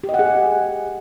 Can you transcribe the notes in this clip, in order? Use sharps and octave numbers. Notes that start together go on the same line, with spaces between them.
G4
D#5
F#5
G#4